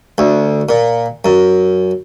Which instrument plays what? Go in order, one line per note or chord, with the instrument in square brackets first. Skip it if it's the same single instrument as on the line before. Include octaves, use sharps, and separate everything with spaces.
[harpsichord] D2
A#2
F#2